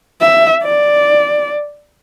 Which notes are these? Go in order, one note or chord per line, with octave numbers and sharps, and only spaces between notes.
E5
D5